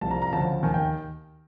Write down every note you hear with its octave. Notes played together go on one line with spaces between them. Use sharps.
C2 C3 F3 A5
A#5
A#5
D2 C#3 F3 A5
D#2 D#3 G#5
G5